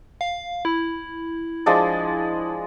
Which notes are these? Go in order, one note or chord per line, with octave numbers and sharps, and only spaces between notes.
F5
E4
F3 G#3 D4